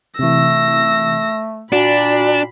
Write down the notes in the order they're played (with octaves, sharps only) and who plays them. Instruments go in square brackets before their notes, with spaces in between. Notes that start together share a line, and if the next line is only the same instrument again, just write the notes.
[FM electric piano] C3 E3 [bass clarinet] A3 [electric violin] E6 A#6
[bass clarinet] A#2 [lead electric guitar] D4 [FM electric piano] F#4 [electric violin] B5